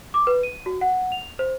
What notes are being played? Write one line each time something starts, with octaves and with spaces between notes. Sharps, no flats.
D6
B4
D#7
F#4
F#5
F7
C5